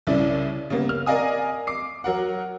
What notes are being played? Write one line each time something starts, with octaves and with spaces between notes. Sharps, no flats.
C2 C#3 C#4 E4 D5
C#3 G3 A#3 B3
F6
A#4 D5 D#5 F5 G#5 D#6
D6 C7
F#3 A#4 F#5